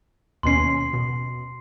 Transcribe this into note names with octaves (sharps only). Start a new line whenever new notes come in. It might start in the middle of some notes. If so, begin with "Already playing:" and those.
D#2 B2 C#4 C6 C7
B2